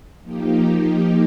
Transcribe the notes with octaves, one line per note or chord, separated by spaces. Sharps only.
F3 A#3 D#4 G4